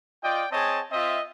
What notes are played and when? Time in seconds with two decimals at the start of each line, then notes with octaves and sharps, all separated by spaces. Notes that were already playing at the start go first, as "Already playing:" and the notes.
0.23 F4 D5 D#5 G5
0.52 C4 G#4 C#5 D#5 A5
0.91 C4 F4 D#5 E5